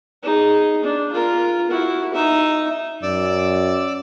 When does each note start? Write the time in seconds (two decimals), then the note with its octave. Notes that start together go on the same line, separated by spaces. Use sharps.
0.23 D#4 G#4
0.84 D4
1.12 F4 A#4
1.70 E4 F#4
2.14 D#4 E5
3.03 F#2 D5 D6 E6